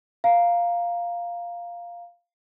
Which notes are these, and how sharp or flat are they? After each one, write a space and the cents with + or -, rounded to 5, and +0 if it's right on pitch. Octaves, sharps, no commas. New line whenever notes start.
F5 +0 A#5 +0